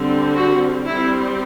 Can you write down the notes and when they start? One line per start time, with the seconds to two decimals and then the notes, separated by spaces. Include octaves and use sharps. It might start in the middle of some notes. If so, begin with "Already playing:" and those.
Already playing: D3 G3 C4
0.36 F#4
0.87 G3 C4 E4